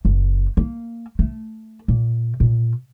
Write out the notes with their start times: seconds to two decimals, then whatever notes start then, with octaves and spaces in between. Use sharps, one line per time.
0.05 F#1
0.57 A#3
1.19 A3
1.88 A#2
2.40 A#2